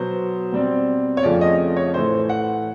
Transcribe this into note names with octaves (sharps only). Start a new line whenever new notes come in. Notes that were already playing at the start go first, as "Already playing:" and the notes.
Already playing: B2 F#3 B3 C5
B2 G3 C4
C#5
F2 C#3 F3 A3 D5
D#5
C#5
A2 E3 A3 C5
F#5